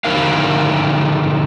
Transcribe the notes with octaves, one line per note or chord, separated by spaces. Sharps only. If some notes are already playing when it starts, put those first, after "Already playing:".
D3 F3 A3 D#4 A#4 F5